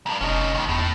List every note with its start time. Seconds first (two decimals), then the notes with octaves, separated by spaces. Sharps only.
0.06 B1 G2
0.21 F1 C#4 D#4
0.54 D#2 D#3
0.69 E2 A2